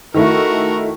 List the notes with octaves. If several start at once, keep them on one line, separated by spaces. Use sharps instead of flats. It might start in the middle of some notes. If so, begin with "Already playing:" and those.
D#3 A3 E4 F#4 A#4